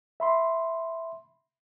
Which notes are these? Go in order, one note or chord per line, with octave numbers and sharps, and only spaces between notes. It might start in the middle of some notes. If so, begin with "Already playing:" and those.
E5 B5 C6